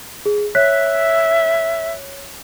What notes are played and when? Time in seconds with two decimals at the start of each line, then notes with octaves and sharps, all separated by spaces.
0.26 G#4
0.55 C#5 E5 F#6 B6